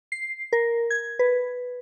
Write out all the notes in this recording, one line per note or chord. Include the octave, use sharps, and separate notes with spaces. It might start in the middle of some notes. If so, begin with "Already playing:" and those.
C7
A#4
G#6
B4